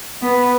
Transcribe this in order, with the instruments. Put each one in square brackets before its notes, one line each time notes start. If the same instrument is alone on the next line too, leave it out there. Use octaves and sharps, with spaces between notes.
[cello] B3 [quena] B4